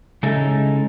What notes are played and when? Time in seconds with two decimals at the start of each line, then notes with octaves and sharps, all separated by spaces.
0.23 C#3 G#3 D#4 E4 A4